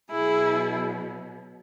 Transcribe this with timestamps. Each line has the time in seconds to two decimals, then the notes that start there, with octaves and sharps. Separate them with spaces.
0.11 B2 F#3 E4 G#4